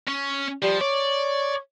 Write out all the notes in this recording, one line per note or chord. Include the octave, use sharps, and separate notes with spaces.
C#4
F3 G3
C#5 D5